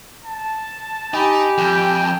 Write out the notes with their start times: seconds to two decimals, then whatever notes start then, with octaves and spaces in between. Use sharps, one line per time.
0.25 A5
1.14 D#4 G4 G#5 B5
1.58 F2 G5